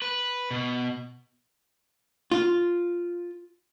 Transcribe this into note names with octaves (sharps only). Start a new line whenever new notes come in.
B4
B2
F4